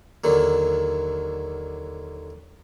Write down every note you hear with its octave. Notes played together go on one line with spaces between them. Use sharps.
D#2 D3 D#3 F#3